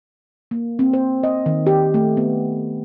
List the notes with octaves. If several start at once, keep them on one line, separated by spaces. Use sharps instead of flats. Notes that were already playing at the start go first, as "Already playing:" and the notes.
A#3
C4
C5
D#5
D#3
G4
A3
B3